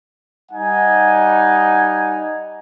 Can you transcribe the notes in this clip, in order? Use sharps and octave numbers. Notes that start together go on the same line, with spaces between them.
G3 D#4 F#5 G#5